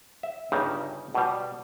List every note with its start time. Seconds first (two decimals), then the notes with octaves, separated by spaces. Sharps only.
0.23 E5
0.52 G1 G2 C#3 D#4 G4
1.15 B2 G3